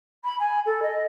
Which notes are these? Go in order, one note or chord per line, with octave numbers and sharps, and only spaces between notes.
B5
G#5
A4
D#5